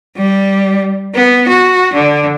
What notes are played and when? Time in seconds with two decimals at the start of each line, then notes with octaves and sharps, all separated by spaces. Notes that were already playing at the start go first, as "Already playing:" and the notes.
0.17 G3
1.15 B3
1.49 F#4
1.94 D3